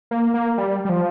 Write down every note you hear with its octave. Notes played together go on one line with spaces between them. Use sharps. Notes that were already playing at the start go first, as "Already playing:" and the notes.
A#3
A#3
G3
G3
F3